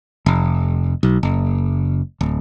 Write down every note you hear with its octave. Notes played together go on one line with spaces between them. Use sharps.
F1
B1
F#1
D1